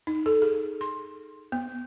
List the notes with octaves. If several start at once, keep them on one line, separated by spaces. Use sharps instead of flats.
D#4
A4
G#4
C6
B3